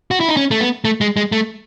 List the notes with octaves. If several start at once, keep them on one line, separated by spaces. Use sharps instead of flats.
F#4
E4
D#4
C#4
A3
B3
A3
G#3
G#3
A3